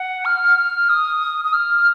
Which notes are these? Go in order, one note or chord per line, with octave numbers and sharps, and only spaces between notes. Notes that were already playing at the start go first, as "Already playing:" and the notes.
Already playing: F#5
F6
D#6
D#6
F6